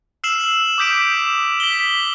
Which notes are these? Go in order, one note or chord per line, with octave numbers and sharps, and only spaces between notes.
E6 F6 C7 E7 F#7
D6 D#6 G6 B6 D7 E7
B6 F#7 G7